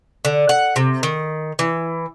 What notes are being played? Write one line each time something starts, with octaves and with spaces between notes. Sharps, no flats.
D3
F#5
C3
D#3
E3